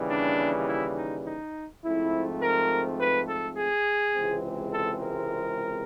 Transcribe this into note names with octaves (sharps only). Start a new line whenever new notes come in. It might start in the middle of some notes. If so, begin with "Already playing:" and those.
Already playing: D#2 C#3 E3 G3
D4
E4
D#4
D#4
G#2 F3 A3 C4 E4
A#4
B4
A4
G#4
C#2 C3 E3 G#3 C4
A4
A#4